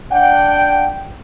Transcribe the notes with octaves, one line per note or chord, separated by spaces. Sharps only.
D4 F#5 G5